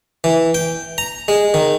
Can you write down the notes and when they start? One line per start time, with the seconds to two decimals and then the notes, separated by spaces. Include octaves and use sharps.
0.24 E3
0.54 G5
0.98 A#5
1.28 G#3
1.54 D#3